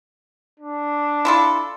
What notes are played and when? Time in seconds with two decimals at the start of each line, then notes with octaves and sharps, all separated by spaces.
0.60 D4
1.25 E4 F4 A4